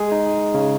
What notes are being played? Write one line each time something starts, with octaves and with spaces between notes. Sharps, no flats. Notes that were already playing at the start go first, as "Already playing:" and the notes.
Already playing: G#3 G#4
D#4
C#3